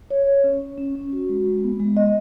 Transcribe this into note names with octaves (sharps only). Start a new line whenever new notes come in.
C#5
C#5
C#4
C#4
C#4
C#4
F#4
G#3
G#3
B3
G#3
D#5